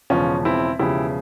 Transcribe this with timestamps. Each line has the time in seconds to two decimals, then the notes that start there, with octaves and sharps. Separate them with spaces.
0.10 E1 E2 C#3 F3 C#4 F4
0.45 C4 E4
0.79 E1 E2 C#3 F3 E4 G4